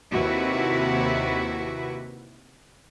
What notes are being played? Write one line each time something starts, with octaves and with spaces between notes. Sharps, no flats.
D#2 C3 E4 F#4 B4 E5